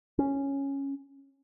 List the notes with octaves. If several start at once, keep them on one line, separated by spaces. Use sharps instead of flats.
C#4